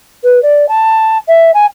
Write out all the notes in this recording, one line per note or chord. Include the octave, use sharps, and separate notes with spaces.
B4
D5
A5
E5
G#5